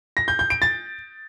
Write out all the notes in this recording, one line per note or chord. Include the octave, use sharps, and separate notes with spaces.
A#6
G6
G6
D7
A6